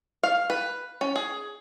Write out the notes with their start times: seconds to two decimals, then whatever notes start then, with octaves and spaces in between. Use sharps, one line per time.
0.23 F5
0.50 B4
1.01 C#4
1.16 G#4